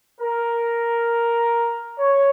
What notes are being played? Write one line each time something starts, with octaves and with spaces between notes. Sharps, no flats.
A#4
C#5